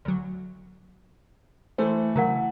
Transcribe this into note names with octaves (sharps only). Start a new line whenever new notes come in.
D2 F#3
E3 A3 C5
C#3 F#3 E4 A#4 F#5